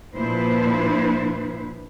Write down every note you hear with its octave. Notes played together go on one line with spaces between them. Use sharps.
A#2 F3 D4 E4 B4 C5